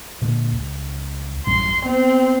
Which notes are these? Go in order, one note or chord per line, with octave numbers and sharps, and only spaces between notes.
A#2 D3 G#3
C#2
A1 F#2 G3 C6
B3 C4